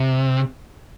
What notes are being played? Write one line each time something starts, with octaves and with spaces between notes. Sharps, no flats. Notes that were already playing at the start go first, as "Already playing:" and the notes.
Already playing: C3